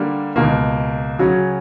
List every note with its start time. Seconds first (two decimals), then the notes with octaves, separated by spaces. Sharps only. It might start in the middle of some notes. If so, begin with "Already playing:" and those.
Already playing: D3 G3 A#3
0.36 C#2 B2 A#3
1.19 C#3 F#3 C#4 F#4